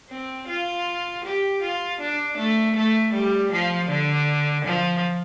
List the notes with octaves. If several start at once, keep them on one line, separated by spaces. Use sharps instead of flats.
C4
F4
G4
F4
D4
A3
A3
G3
F3
D3
F3